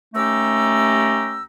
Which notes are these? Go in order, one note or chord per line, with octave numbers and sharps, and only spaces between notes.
D#2 A3 C#4 G4 A#5 E6